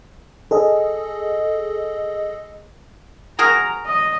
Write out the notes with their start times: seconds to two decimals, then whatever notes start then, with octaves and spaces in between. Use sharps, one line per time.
0.51 G#4 A4 D#5
3.39 F#4 G#4 A#4 A#5
3.86 D#5